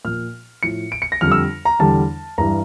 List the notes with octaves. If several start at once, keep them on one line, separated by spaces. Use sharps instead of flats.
A#2 F3 F6
A2 F3 C#7
D7
C#7
A#6
F2 D3 G3 F6
E6
A#5
E2 D3 G3 A5
G2 E3 G3 A#5